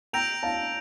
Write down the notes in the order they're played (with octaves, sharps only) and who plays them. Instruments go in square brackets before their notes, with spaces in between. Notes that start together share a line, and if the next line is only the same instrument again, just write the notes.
[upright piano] G5 A#5 [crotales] E6 G6 A#6 D7 F7
[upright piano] F5 A5